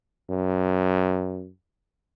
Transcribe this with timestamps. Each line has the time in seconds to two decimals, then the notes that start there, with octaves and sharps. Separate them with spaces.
0.30 F#2